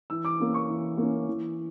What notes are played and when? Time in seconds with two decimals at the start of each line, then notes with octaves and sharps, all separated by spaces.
0.10 E3 E6
0.25 D6
0.40 A#3 C#4
0.54 C#6
0.69 E3
0.98 A#3 C#4
1.27 E3